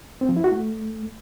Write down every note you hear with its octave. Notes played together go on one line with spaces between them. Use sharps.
C4
F3
E4
F#4
A3